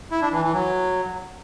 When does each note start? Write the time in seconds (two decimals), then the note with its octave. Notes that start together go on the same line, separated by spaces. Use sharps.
0.11 E4
0.22 D4
0.32 E3
0.43 E3
0.53 F#3